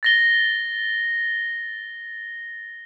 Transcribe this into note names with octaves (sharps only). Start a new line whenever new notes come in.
A6 A#6 G7